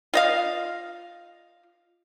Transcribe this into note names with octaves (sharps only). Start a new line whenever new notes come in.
F4 D#5 F5